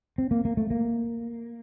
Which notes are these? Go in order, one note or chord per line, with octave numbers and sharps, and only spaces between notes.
C4
A#3
A#3
A3
A#3